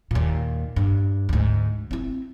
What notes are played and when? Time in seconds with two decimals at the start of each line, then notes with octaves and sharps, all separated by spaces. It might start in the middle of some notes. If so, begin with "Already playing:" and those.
0.11 D#2 A#2
0.76 G2
1.29 D2 G#2
1.91 C4 E4